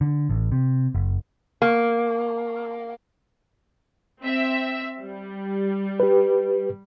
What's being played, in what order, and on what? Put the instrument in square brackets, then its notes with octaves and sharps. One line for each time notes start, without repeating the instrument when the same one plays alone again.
[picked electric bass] D3
A1
C3
F#1
[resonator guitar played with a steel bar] A#3
[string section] C4 E5
G3
[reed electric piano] G4 B4